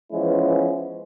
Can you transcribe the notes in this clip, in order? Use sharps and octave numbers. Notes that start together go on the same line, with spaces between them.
E3 F3 G#3 B3 C#4 E4